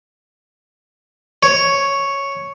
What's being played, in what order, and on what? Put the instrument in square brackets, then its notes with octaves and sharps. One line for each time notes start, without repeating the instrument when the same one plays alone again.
[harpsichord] C#5